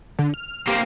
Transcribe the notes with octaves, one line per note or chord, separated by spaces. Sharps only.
D3
F6
A#3 C4 G4